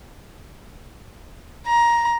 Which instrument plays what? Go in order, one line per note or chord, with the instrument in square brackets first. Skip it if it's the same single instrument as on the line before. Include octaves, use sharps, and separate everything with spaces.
[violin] A#5